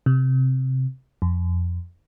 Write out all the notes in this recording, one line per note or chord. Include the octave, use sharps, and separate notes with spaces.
C3
F2